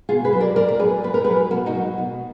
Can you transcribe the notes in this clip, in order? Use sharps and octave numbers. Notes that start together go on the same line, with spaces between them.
B2 F4 G#4
G#4 B4
F#3
A#4 D5
A#2 A#4 D5
D5
F#3 G#4 B4
A#2 B4
A#4
F#3 G#4 B4
B2 F#4 A#4
D#4 F#4
F#3
B2